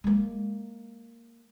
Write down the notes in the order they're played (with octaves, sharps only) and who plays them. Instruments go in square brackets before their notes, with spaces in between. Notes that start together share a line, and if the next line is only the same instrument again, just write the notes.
[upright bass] G#3 A#3